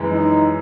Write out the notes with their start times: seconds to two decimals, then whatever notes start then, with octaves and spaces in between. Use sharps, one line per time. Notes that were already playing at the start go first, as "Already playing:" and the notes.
Already playing: F#2 E3 G#3
0.11 D#4